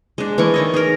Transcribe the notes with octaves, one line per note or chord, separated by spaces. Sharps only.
G#3 D4
E3 E4 A#4 C#6
D#3 C#5 D#5
G#4 A#4